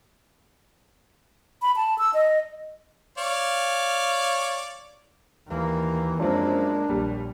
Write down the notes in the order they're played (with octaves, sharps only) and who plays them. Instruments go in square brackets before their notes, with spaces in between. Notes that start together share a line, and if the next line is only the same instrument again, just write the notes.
[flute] B5
A5
E6
D#5
[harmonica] C#5 D5 F5
[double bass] D#2 A#3 [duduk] E3
[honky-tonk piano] F#2 F3 C4 [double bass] G#3 A#3 [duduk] D4
[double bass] A#1 [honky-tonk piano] D#2 G3